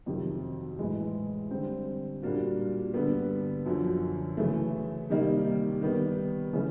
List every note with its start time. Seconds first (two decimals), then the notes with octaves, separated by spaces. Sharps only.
0.06 F2 C3 D#3 F#3
0.79 A2 E3 G#3
1.51 D3 G3 C4
2.22 A#2 G3 A#3 D4 F#4
2.94 G2 D3 G3 B3
3.66 F#2 D3 F3
4.37 C#3 E3 A3
5.10 C3 D#3 G3 A#3 D#4
5.82 D#3 G3 B3
6.53 C#3 E3 A3 C#4